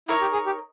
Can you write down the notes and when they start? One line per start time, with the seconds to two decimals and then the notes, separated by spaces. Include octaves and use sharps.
0.08 D#4 E4 A#4 C#5
0.21 G4
0.33 G#4
0.46 G4